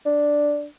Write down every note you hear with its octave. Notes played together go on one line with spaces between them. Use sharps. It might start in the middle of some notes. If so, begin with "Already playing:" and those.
D4